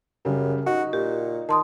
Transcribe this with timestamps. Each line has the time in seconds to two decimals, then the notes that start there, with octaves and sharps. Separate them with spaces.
0.25 F#2 C#3 G3
0.66 D#4 F#4
0.93 A#2 G4
1.49 D#3 A5 C6 D#6